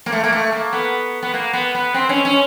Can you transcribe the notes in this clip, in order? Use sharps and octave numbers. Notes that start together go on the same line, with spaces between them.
A#3
A3
A#3
A3
A#3
B3
B3
A#3
B3
B3
C4
C#4
C#4